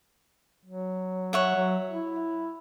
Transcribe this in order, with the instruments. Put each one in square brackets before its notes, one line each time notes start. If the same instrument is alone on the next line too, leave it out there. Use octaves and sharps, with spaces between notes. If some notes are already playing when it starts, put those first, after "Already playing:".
[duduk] F#3
[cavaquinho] C#5 E5 F#5
[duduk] F#3
E4